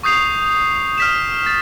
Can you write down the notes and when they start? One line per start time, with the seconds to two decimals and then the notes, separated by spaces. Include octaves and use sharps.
0.03 C#6 D#6 G6 C7 F7
0.98 F6 B6 E7
1.46 A6